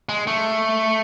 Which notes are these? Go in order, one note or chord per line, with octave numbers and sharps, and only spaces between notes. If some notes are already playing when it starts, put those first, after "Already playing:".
G#3
A3